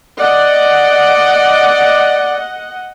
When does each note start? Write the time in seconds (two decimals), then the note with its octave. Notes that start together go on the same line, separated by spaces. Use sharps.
0.19 D5 D#5 F#5